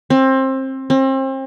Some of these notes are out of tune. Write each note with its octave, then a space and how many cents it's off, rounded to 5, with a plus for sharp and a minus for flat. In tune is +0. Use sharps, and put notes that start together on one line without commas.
C4 +25
C4 +35